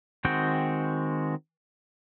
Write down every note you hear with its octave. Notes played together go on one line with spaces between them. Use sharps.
D#3 G#3 C4 F#4 G5